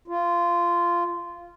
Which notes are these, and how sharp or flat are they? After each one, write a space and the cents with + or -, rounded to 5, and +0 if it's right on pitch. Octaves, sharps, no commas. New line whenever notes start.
F4 -15